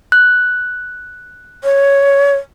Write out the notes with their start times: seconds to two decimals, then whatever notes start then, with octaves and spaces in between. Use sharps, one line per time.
0.12 F#6
1.64 C#5